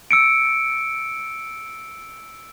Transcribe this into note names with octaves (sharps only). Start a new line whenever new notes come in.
E6 C#7 D7